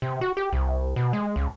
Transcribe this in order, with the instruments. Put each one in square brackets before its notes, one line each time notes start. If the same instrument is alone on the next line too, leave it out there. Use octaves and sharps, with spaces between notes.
[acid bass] C3
F#4
G4
C2
B2
G#3
C#2